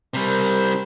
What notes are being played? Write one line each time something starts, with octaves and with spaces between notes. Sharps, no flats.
C3 G3 A#4 C5